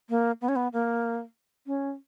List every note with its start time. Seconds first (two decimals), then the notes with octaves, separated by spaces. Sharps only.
0.10 A#3
0.41 B3
0.49 C#4
0.56 B3
0.73 A#3
1.67 C#4